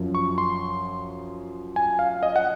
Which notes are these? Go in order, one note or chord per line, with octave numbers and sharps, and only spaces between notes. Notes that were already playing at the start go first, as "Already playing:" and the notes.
Already playing: F#2 F3
C#6
C6
G#5
F5
D#5
F#5